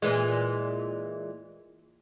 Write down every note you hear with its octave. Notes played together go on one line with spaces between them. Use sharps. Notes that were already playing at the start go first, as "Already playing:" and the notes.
A#2 E3 G#3